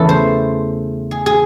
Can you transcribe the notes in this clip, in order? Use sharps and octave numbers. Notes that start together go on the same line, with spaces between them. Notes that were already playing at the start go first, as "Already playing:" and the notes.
Already playing: E2 C#3 E3 A3 A4
C5
G#4
G#4